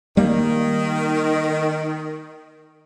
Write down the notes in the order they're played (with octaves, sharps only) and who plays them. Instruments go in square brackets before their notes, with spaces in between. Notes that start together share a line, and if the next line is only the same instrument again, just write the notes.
[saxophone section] D#3 [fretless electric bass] G3 A#3